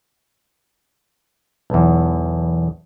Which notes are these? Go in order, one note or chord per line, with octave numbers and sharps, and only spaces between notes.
B1 E2